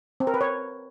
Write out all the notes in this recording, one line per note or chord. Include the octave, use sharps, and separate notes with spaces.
C4
A#4
B4
C#5